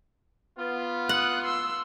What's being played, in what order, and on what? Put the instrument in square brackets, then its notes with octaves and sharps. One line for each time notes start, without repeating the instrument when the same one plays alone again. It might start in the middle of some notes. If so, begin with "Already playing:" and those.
[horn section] B3 F4
[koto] F#5 [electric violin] D#6 F#6
[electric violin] C6 E6